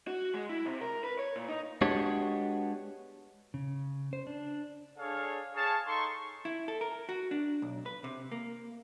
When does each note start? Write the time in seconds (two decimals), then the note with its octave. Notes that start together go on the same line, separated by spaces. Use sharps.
0.08 F#4
0.34 G#3
0.50 E4
0.66 C3
0.81 A#4
1.04 B4
1.19 C#5
1.36 A#2
1.49 D#4
1.81 G#3 B3 D4 F#4 G4 C#5
3.54 C#3
4.13 C5
4.27 D4
4.98 D4 G#4 A4 C#5 F5
5.56 G#4 C#5 F5 A5
5.87 D#4 A4 C6 C#6
6.45 E4
6.68 A4
6.81 A#4
7.09 F#4
7.31 D4
7.62 B1
7.86 B4
8.04 C3
8.32 A#3